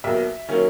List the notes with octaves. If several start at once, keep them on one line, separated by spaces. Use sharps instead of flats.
B1 B2 A#3 E5
D#3 F#3 A#3 C#4